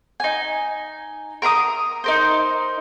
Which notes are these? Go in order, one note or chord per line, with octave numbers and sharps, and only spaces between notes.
D#4 G#5
A#4 A#5 B5 D#6
D#4 A#4 C5